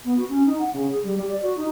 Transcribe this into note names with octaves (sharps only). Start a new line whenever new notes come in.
B3
F#4
C#4
D#4
F#5
C#3
G#4
G3
G4
D5
F#4
D#4